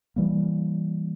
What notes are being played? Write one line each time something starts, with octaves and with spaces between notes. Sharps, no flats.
E3 G3 A#3